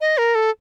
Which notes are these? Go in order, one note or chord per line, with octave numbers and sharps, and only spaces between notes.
D#5
A#4
A4